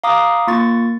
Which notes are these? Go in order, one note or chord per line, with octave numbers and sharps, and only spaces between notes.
F5 A#5 D6 D#6
A#3 F4 C#6 A6